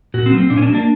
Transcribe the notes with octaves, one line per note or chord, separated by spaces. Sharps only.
A#2 F#4
C4
F#3 A#3
C4
A#2 D4
C#4
D4
F#3
A#3 D4